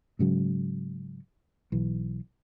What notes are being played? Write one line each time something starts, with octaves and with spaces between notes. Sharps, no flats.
G#2 C#3 F#3
B1 E3